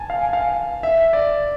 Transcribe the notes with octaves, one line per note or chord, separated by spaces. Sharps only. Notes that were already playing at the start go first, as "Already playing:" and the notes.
Already playing: G#5 A5
F5
G#5
F5
E5
D5